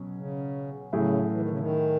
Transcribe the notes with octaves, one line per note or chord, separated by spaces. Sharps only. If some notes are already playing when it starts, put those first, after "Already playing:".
Already playing: B2 F#3 C#4
C#3
A2 C#3 F#3 A3 E4 G#4
E3
D#3
C#3
D#3